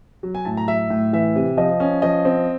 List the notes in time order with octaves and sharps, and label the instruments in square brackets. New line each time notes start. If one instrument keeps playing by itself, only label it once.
[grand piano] F#3
G#5
A2 A5
A#5
F#3 E5
A2
E3 E5
C3
F3 D#5
C#4
F3 D#5
C4